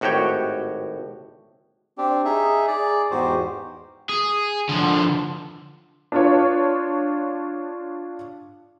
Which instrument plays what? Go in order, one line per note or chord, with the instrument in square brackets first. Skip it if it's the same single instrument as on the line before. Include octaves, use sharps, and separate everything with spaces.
[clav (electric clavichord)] G#1 A2 F#4 G4 C#5 G5
[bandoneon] C4 D4 G4
D#4 G#4 E5
G#4 D5
E2 G#2 F#4 G4 C5
[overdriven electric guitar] G#4
D3 F3
[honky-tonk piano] D4 F4 C#5